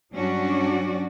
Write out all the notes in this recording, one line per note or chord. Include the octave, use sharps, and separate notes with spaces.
G2 F#3 C#4 D4 F#4 D5